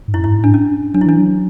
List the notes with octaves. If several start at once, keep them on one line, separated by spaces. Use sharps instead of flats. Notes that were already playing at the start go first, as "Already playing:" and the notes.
G#2
F#2 E4
E4
G#2
A2 D4
C#4
F#3 D4
E4
E3 D4
F#3